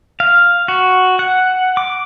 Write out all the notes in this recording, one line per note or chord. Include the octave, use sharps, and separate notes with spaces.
F5
F#4
F#5
D6